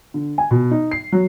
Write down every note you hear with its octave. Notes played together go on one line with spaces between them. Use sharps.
D3
G#5
B2
D#4
C7
F#3